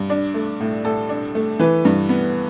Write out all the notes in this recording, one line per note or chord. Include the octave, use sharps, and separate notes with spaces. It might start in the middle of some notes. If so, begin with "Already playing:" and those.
Already playing: G2
D4
A3
A2
A2 A4
D4
A3
E3 B4
G2
B3